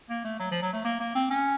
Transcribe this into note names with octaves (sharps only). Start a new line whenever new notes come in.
A#3
A3
F#3
F3
F#3
A3
A#3
A#3
C4
C#4